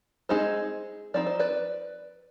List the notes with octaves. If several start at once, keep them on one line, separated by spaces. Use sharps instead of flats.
G#3 C4 D#4 G#4 C5
F3 C4 D#4 D5
C5
B4 D5